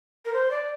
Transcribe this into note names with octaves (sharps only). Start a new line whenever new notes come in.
A#4
C5
D5